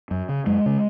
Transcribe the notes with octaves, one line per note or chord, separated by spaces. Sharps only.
F#2
C#3
F#2 G#3
C#3